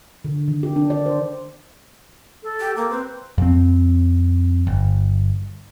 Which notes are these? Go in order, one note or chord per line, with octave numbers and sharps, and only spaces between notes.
D3
D#3
G4
D4
D5
C5
A4
G4
A#3
C4 B4
F2 C4
G1